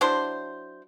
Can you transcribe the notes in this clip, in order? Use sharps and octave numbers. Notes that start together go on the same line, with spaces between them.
F#3 D4 E4 C5